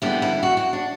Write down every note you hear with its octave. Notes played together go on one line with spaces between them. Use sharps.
F2 D3 G3 B3 E4
E4
F#4
F#4
D4